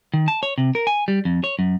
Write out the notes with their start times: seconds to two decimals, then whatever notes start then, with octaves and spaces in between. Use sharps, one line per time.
0.14 D#3
0.28 A5
0.43 C#5
0.58 C3
0.75 A#4
0.87 G#5
1.08 G3
1.25 F2
1.44 C#5
1.59 F#2